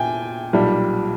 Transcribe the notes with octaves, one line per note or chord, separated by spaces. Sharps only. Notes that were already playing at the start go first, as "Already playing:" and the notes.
Already playing: A#2 G5 G#5
B1 A#2 G3